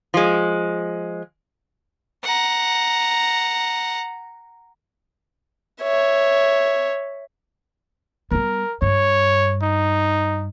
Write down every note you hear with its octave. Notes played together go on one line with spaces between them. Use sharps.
F3 G#3
F#5 A#5
C#5 E5
G3 B3 A#4
G2 C#5
D#4